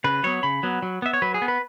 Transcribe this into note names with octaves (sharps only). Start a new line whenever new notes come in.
C#3 B4
F#3 B3 C#5
C#3 B5
F#3 B3
F#3
B3 E5
C#5
F#3 B4
G#4
B3
B4